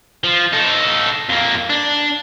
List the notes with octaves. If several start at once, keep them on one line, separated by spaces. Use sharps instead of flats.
F3
D#4 A4
F2 A#3
D4